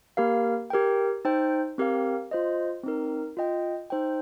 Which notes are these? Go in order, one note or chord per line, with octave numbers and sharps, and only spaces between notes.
A#3 G4 A#4 F5
G4 A#4 G5
D#4 C5 G5
C4 G4 A#4 F5
F4 C5 D#5
C4 D#4 A#4
F4 D#5 G5
D#4 C5 G5